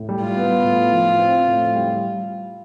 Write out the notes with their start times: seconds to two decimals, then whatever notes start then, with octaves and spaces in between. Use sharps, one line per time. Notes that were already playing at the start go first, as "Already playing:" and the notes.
Already playing: A2
0.09 G3
0.22 F4
0.37 B3
0.64 A2
0.92 F3
1.19 C4
1.48 A2
1.75 G3